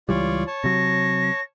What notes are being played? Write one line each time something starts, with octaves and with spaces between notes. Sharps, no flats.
C#2 E3 G3 F4 C#5 D5
C#5 A5
C3 F#3 A#6